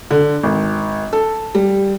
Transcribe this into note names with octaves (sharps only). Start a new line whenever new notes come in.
D3
G#1
A4
G3